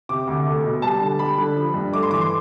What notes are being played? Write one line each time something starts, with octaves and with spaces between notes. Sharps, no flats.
C3 D6
D2
A3
B2
G3 A5
D3
G3 B5
D3
F3
G2
A3 D6
C6
E3 D6
C6